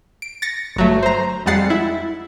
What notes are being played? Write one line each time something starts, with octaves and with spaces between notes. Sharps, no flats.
D7
A6 A#6 C#7
G1 F#3 A3
C5 A#5
F2 G3 G#3 F#5 A6 C7
E4